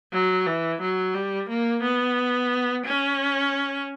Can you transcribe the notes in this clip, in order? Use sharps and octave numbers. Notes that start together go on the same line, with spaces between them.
F#3
E3
F#3
G3
A#3
B3
C#4